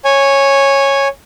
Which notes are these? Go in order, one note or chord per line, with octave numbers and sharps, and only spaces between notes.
C#5 G#5